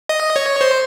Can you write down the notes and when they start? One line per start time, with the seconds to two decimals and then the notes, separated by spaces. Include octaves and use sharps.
0.09 D#5
0.36 C#5
0.61 C5